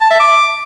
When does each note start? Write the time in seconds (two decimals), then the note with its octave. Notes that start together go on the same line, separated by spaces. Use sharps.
0.01 A5
0.11 E5
0.20 D6